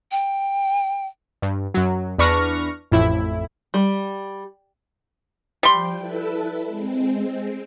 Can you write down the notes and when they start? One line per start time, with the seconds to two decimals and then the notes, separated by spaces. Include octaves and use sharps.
0.11 G5
1.42 G2
1.74 F#2 F#3
2.18 E2 D4 B4 C#6 F6 A#6
2.91 A1 F2 A2 E4
3.74 G3
5.63 F3 G3 G5 C6
5.96 E4 A4 B4
6.65 G#3 C4